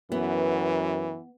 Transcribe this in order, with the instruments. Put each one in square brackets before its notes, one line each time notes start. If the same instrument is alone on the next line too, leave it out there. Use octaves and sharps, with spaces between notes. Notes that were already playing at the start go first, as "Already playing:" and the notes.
[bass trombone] F#2 [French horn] E3 [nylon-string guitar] B3